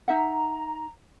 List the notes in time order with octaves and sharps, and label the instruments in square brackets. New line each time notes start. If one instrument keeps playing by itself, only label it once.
[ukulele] D#4 E5 F#5 [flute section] A#5